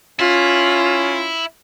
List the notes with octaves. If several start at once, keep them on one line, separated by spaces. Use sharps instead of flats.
C#4 E4 F4